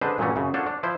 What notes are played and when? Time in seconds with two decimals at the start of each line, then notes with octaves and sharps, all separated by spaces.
0.01 D3 G#3 D4 B4 C5
0.18 G2 A#2 E3 F#3 A3 C#4
0.36 F#2 C#3
0.54 D4 F4 F#4 A4 C5 C#5
0.67 D4
0.83 F3 E4 C5